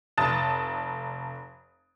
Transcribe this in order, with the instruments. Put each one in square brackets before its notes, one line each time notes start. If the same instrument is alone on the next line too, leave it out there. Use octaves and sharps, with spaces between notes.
[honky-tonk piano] F1 A5 D#6 A6 E7